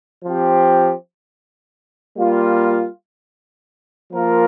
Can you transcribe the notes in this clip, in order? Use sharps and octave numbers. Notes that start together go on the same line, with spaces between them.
F3 C4 G4
G3 A#3 F4
F3 A#3 F4 A#4